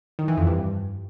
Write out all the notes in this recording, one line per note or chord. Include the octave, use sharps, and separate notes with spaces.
D#3
E3
F2
G2